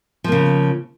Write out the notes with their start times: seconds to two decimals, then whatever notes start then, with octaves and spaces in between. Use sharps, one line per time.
0.24 F3
0.28 A#3
0.32 C#3